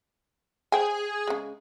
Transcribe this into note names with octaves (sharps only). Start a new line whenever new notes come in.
G#4 C5 G5 G#5
C#3 G#3